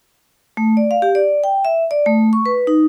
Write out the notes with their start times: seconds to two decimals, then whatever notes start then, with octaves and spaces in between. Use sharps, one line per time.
0.57 A3
0.77 D5
0.91 F5
1.02 G4
1.15 D5
1.44 G5
1.65 E5
1.91 D5
2.06 A3
2.33 C#6
2.46 B4
2.67 D#4